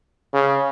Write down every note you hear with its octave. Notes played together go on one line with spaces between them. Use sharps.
C#3